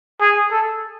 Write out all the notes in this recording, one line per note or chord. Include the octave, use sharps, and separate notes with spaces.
G#4
A4